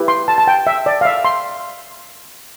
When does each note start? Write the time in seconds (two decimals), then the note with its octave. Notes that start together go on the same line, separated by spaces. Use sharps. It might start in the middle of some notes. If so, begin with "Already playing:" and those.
Already playing: E4 G4 B4
0.08 C6
0.28 A5
0.38 A5
0.48 G5
0.67 E5
0.86 D5
1.01 F5
1.05 E5
1.25 C6